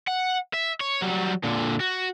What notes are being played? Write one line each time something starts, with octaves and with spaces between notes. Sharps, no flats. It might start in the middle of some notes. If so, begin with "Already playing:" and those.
F#5
E5
C#5
F#3 G3
A#2 D3
F#4